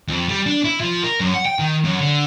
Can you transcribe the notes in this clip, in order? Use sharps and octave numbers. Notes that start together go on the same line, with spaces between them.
F2
G3
D4
E4
F3
A#4
F#2
F#5
G5
D#3
F#2
D3